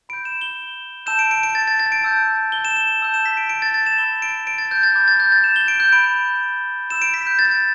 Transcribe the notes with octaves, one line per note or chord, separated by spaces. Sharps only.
B5 G6 D7
E7
G7
A5 E6 G6 E7
D7
D7
D7
A6
A6
A6
D7
A5 E6 G6
G7
E7
E7
E7
A5 E6 G6
E7
B6
D7
D7
A6
A6
E7
B5 E6 G6 G7
D7
D7
A6
G6
A6
B5 D6 G6
A6
G6
A6
E7
G7
D7
G6
B5 G6 D7
B5 E6 G6 E7
D7
B6
G6
A6
A6